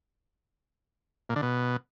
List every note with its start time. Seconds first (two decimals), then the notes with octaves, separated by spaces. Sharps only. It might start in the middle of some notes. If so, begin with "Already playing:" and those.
1.29 A#2
1.36 D3
1.42 B2